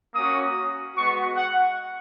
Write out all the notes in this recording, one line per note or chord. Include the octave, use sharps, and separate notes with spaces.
A#3 C#4 F#4 D#6
G#3 B3 F#4 C#6
F#5